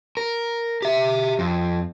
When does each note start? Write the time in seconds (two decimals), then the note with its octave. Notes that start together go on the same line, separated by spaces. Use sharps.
0.17 A#4
0.82 G4 E5
1.39 F2